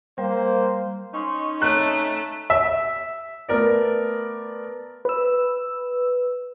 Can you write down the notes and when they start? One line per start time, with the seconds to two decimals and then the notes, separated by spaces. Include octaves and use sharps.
0.18 G3 A#3 C5
1.14 C#4 D#4 C6 C#6
1.62 A3 C#5 A#5 F#6
2.50 E5
3.48 A3 B3 A#4 D5
5.05 B4 E6